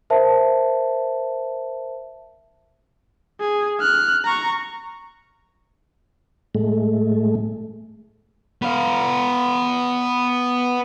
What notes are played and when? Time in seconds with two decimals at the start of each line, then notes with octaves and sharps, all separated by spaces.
0.10 A#4 C5 E5 A5
3.40 G#4
3.80 F6 F#6
4.25 A#5 C#6
6.55 A2 G#3 A3
8.62 B3 F5